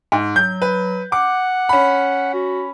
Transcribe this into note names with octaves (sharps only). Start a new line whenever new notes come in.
G#2
F#3 G6
B4
F#5 D6
C#4 B5
F#4